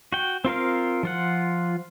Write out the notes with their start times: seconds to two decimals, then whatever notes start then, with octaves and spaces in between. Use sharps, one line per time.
0.12 F#4 G5
0.45 C4 F4 A#4 F5
1.03 F3 F4 F#5